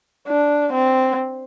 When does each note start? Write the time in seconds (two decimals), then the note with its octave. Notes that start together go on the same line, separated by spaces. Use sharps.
0.28 D4
0.73 C4